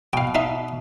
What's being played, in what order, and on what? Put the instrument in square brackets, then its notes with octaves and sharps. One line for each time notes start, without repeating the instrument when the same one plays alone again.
[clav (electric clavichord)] B2 [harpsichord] F5 G5
[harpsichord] D#4 E5 F5